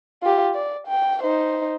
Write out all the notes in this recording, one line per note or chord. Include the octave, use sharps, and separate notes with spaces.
F4 G4
D5
G5
D#4 C5